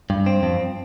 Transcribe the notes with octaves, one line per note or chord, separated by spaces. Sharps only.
G2
C4
F2